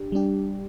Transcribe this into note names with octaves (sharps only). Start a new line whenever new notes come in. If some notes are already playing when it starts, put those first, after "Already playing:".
Already playing: D4 G4
G3 D4 G4